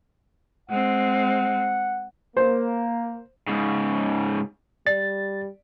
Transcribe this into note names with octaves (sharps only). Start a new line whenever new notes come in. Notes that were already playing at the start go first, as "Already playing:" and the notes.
G#3 C4 F#5
A#3 C5
G#2 C#3
G3 D5 A6